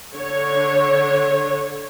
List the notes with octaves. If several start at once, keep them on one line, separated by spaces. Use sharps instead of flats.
D3 C#5